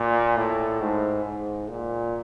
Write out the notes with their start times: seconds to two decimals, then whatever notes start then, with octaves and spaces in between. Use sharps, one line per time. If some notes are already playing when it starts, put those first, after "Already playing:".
Already playing: A#2
0.37 A2
0.81 G#2
1.25 G#2
1.69 A#2